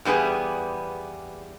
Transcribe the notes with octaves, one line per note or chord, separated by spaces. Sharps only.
E2 G3 B3 G#4 B4